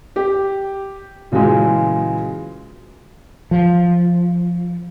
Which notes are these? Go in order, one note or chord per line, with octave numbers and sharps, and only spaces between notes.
G4
A#2 C#3 E3 F#3 G#3
F3